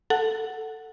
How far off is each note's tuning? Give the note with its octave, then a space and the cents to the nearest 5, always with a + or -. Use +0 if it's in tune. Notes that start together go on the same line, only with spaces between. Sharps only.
A4 +10 F#5 +0